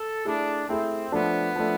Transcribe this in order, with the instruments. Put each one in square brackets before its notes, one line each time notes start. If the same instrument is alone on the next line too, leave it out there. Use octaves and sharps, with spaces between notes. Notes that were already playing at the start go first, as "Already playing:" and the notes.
Already playing: [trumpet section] A4
[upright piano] A3 E4 G#4 [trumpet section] D4
[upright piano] A3 E4 G#4 [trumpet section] C4
[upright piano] F3 A3 D4 [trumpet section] B3
[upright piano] F3 A3 D4